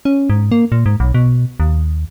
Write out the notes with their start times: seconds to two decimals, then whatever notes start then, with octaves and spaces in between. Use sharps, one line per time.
0.05 C#4
0.30 G#2
0.52 A#3
0.72 A#2
0.86 G#2
1.00 B1
1.14 B2
1.60 D#2